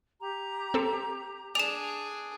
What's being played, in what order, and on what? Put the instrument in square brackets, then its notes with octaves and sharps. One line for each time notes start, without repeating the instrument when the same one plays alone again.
[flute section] G4 A#5
[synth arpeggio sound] C4 A4
[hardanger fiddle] D4 G#4 [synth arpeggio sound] D5 [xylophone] E7 F7